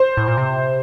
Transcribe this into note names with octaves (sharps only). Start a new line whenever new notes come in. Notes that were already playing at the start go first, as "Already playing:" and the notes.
Already playing: C5
A2
A#2
C3